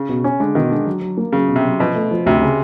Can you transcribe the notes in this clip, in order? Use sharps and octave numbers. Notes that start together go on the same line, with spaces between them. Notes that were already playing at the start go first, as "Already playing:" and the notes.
Already playing: C#3
B2
C#4
D3 G#3
B2 D#3
D3 G#3
F#3
F#3
A#3
C#3 F#3
B2
C3
F#3
B2 F3
A3
F3
D2 C3
C#3